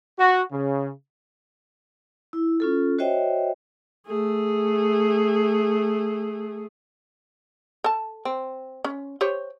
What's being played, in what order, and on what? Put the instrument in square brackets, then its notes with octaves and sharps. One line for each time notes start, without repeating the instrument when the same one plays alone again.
[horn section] F#4
C#3
[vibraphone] E4
C#4 F4 A4
F#4 C5 C#5 D#5 E5 G5
[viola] A3 G#4
[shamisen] A4 A5
C4
C#4
G4 C5 C#5